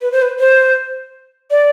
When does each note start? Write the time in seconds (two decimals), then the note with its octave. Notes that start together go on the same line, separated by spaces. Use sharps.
0.02 B4
0.12 C5
0.22 B4
0.39 C5
1.51 D5